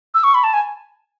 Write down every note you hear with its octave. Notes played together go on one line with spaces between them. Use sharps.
E6
C#6
B5
A5
G#5